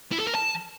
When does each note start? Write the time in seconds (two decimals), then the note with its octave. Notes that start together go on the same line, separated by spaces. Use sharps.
0.12 E4
0.20 A4
0.27 A#4
0.35 A5